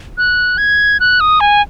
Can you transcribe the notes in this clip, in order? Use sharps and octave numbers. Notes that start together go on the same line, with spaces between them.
F#6
G#6
F#6
D#6
G#5